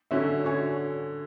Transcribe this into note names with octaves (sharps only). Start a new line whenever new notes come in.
D3 C#4 F#4 C#5 E5
D4 F#4 C#5 G#5